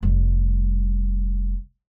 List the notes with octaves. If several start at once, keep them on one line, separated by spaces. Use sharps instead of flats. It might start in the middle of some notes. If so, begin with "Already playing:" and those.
F1 G3